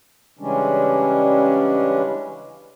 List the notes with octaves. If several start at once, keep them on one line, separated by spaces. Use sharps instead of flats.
C#3 E3 G3 G#3 C#4 D4